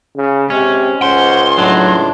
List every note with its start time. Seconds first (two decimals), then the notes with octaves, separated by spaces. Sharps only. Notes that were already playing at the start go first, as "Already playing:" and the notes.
0.16 C#3
0.50 C3 G#3 C#4
1.02 C#2 C5 F#5 C6
1.58 A2 F#3 D4